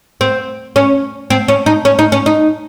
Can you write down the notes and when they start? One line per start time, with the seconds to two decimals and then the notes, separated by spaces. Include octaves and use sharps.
0.21 C4
0.76 C#4
1.30 C4
1.48 C#4
1.66 D#4
1.85 C#4
1.99 D#4
2.12 C#4
2.26 D#4